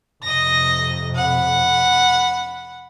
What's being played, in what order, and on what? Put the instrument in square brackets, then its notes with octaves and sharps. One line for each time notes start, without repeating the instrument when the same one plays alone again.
[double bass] F2 C3 [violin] D#5 A#6
[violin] F#5 B5